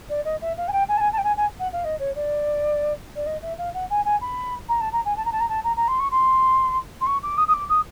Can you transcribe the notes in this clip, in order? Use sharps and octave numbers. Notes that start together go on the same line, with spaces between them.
D5
D#5
E5
F5
G#5
G5
G#5
A5
G#5
A5
G5
G#5
G#5
F#5
F5
D#5
C#5
D5
D5
D#5
E5
F5
F#5
G#5
G#5
B5
A#5
A5
A#5
G#5
A5
A#5
A5
A#5
A5
A#5
A#5
C6
C#6
C6
C6
C#6
D6
D#6
D#6
D6
D#6